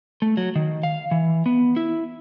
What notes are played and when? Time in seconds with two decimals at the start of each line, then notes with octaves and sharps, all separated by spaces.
0.22 A3
0.37 F#3
0.56 D#3
0.83 F5
1.11 E3
1.46 B3
1.76 E4